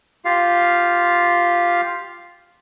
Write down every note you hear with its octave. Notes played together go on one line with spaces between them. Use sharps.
F4 G4 F5